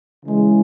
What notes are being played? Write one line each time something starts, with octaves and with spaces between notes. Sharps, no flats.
C#3 E3 G#3